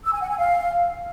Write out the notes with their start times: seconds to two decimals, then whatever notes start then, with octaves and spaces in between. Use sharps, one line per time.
0.04 E6
0.13 G#5
0.21 F#5
0.30 G#5
0.38 F5